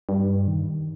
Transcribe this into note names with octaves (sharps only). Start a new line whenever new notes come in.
G2
D#3